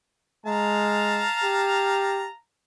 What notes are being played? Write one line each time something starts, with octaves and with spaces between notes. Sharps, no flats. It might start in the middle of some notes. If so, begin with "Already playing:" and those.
G#3 F5 A5 A#5
G4